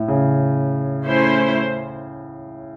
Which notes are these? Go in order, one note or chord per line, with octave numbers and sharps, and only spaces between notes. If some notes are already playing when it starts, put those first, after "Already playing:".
Already playing: A2
C#3
A3 C#4 E4 C5